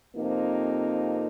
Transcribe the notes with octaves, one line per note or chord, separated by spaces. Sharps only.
F2 C3 F3 A#3 D#4